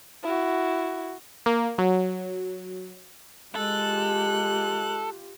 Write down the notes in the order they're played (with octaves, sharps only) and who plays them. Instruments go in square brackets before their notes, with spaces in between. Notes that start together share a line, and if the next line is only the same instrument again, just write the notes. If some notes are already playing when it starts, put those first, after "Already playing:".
[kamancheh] E4 F#4
[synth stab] A#3
F#3
[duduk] G#3 [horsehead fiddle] F4 G4 [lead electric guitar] A4 [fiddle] F#6